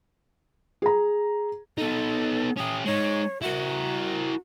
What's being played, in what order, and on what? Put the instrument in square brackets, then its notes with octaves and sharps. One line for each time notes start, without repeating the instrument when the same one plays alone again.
[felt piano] G#4 A#5
[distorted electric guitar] B3 D#4 [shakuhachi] A4
[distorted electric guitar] C#4 G4 [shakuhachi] D#6
[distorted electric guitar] G#3 D#4 [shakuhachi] C#5
[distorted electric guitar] E4 A#4 [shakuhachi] F#4